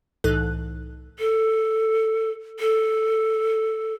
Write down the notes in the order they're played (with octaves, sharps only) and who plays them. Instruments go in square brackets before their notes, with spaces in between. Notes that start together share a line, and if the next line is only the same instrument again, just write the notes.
[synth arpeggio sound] C2 A2 E3 D#4 A4 F#6
[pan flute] A4
A4